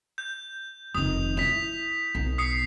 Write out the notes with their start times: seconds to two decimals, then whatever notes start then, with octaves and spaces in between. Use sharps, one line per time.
0.18 G6
0.94 F1 D#3 D#6 F7
1.37 E4 B6 F7
2.15 B1
2.38 D#6 C7 C#7